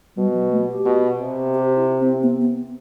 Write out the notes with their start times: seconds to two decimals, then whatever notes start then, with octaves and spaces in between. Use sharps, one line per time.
0.16 B2 G3
0.34 F#3
0.51 A3
0.69 G4
0.85 B2
1.21 C3
1.54 G4
1.77 E4
2.01 C4
2.23 B3
2.41 B3